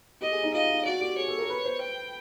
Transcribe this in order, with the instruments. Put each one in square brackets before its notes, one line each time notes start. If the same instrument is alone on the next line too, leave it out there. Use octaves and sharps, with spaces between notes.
[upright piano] G4 [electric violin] D#5
[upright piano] G#4
D#4
[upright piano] F4 [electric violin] D#5
[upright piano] F4
[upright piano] F#4 [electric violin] D5
[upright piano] G4
[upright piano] G#4 [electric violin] C#5
[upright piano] A4
A#4
B4
C5
[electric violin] G5